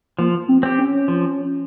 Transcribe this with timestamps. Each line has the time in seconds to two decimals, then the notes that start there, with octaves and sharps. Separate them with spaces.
0.19 F3 A#3
0.49 C4
0.63 C4 G4
0.78 C#4
1.08 F3